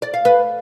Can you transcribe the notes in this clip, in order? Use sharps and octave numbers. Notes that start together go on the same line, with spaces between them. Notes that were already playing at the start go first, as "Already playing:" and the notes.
D5
F5
B4